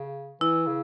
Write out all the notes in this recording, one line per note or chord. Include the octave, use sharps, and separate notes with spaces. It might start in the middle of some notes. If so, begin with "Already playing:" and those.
Already playing: C#3
E3 E4
C#3